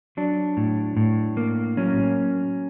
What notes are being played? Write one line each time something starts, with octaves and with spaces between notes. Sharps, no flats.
F#3 D4
A2
A2
A#3
F#3 C#4